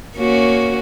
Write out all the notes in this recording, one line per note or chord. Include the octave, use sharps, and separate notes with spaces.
A#3 C#4 F#4